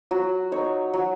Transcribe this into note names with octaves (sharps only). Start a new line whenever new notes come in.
F#3 F#4
D#4 C#5
F#3